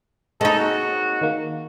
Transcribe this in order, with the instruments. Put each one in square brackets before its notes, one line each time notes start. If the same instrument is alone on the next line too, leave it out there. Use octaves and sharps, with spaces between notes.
[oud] G#3 D#4 [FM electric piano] A#3 C4 C#5 [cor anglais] A4
[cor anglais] F#4
[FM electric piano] D#3 A#3